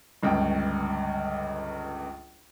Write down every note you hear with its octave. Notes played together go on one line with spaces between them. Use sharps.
G1 C#2 G5